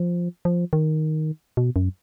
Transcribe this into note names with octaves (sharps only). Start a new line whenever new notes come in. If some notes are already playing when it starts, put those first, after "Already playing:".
Already playing: F3
F3
D#3
B2
F#2